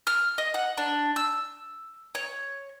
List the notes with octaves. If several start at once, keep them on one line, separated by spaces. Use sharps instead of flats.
F6
D#5
F#5
D4
E6
C#5